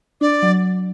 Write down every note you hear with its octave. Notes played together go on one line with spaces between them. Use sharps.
D4 D5
F#3